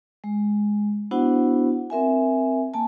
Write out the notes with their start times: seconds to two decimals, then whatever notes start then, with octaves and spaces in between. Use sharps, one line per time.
0.24 G#3
1.11 B3 D4 E4 F#4 C5 F#5
1.90 C4 A#4 E5 G#5
2.74 A#3 G#5 A5